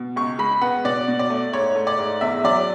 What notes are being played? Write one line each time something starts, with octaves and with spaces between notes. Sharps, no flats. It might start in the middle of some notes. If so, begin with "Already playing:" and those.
Already playing: B2
C#2 C#6
G#3 B5
B3 F#5
B2 D5
B2
D5
A3
G#2 C#5
A3
D5
G#2
E2 E5
F#3 D5